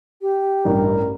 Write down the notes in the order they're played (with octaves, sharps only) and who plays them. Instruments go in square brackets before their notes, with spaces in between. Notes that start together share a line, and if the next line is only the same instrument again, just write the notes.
[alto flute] G4
[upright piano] A1 G2 [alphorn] A#4